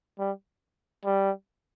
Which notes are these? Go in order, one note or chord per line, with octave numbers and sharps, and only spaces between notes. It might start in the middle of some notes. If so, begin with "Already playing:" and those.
G3
G3